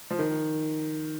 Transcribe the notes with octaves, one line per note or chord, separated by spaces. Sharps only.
F3
D#3